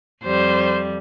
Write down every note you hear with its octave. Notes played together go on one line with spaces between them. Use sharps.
F2 G3 C5